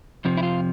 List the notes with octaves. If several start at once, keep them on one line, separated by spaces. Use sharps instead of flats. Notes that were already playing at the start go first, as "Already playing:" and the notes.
F2 C3 F3
E4
F4